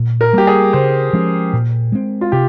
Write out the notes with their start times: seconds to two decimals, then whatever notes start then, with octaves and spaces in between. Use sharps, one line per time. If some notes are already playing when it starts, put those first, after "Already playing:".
Already playing: A#2
0.21 A#4
0.33 G3 A#3 G4
0.47 G#4
0.73 C#3 C5
1.13 F3 G#3 C#4
1.53 A#2
1.92 G#3 C4
2.21 F4
2.32 C3 G4